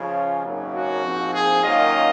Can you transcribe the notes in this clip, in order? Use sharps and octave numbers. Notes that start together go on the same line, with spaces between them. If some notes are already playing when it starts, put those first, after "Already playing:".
Already playing: C#3 F3 G#3 C#4 F4 G#4
G#1 F#2 C#3 F#3 A#3
F#4
A#1 G#2 F3 C4
G#4
F#2 D#3 A#3 C#4 F4 D#5